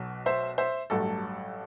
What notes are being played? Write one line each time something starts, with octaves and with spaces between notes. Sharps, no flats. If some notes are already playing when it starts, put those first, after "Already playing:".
Already playing: B1 B2 F#3
C5 E5
C5 E5
A1 G2 F#3 A3 A4